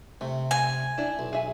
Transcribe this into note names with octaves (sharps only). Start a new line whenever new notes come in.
C3 A3
G#5
D4 E4
B1
G#4 E5 G#5